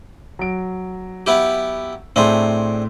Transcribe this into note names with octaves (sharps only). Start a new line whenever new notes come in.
F#3 D7
B3 E4 G4
A2 A3 C4 D4 G#4 C6